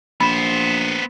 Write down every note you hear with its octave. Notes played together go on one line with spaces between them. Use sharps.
A#1 B3 C5 B5